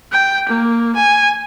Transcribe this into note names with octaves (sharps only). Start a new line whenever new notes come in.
G5
A#3
G#5